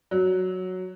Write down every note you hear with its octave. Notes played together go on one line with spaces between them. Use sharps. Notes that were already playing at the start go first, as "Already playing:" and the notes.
F#3